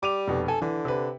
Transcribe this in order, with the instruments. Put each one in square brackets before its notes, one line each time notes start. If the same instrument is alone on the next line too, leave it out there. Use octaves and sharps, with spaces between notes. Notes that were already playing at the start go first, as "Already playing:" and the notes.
[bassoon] G3 [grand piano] D6 D#7 F7
[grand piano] F1 B2
[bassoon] A4 [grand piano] G#5
[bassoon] D3 [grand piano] E3
[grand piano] C3 B4